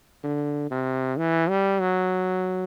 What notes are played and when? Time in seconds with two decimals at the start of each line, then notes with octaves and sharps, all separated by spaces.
0.24 D3
0.71 C3
1.18 E3
1.49 G3
1.81 F#3